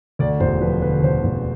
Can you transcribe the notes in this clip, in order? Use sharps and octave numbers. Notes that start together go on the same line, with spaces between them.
D2 D5
E1 C5
F3 B4
D3 B4
D2 C5
E1